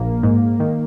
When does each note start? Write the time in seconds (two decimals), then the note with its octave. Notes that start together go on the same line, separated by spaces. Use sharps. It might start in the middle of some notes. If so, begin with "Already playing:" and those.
Already playing: A#1 A#3
0.23 G#2
0.60 D#3